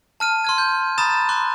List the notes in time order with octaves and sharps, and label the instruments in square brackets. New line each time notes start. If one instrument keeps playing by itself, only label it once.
[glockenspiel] A5 F6 D#7
C6 F6 G#6
G6
A#5 B5 D#6 A6 E7
C6 D6 F#6